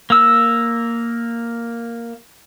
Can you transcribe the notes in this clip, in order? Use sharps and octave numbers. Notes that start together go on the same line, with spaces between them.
A#3 E6